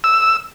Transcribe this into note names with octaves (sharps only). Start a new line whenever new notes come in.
E6